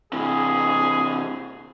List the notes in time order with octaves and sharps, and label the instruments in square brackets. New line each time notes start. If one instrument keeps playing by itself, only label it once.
[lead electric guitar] C3 E3 [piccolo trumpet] G#4